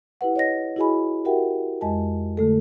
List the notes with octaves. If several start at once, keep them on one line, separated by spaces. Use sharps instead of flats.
E4 G4 B4 F#5
C#5 D#5 A#6
E4 F#4 G#4 D#5 G#5 B5
F#4 G4 A#4 E5 F#5 G5
F2 G#3 D#5 G#5 A5
D3 A3 A4